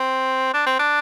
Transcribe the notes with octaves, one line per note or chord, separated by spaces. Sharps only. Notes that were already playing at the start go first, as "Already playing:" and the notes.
Already playing: C4
D4
C4
D4